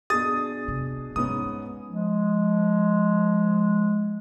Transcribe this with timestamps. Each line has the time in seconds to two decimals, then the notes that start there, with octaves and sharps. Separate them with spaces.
0.10 B2 D4 G#4 D#6 A6
0.68 C3
1.16 G#2 G#3 B3 C#4 D#6
1.88 F3 G#3